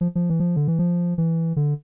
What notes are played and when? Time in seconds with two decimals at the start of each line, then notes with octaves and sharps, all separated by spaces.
0.01 F3
0.15 F3
0.30 E3
0.40 F3
0.56 D3
0.68 E3
0.79 F3
1.18 E3
1.56 D3